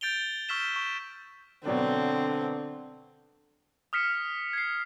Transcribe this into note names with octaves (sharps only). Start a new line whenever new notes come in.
G6 A6 D7 F7 G7
C#6 E6 F6 B6 E7 G7
C#6
B2 D3 F#3 C4 D4
D#6 F6 B6 C#7 E7
G#6 C7